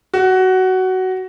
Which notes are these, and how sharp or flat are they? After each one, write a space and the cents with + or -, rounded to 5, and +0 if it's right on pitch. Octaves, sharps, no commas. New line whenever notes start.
F#4 +15